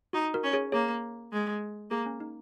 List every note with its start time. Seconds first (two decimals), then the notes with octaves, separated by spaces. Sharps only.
0.13 D#4 F#4
0.34 F#4 A#4
0.43 C#4
0.53 G#4 C#5
0.72 A#3 G#4 C#5
1.32 G#3
1.90 A#3 G#4
2.06 C#4
2.20 D#4